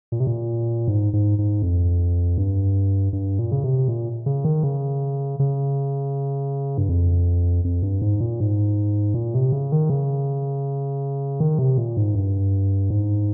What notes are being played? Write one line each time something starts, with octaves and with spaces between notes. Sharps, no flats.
A#2
C3
A#2
G#2
G#2
G#2
F2
G2
G2
A#2
C#3
C3
A#2
C#3
D#3
C#3
C#3
G2
F2
F2
G2
G#2
A#2
G#2
A#2
C3
C#3
D#3
C#3
D#3
C3
A#2
G#2
G2
G#2